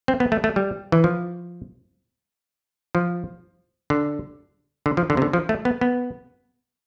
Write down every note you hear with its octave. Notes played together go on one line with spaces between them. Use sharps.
C4
B3
A3
A3
G3
E3
F3
F3
D3
D3
F3
D3
C3
D3
F3
A3
B3
B3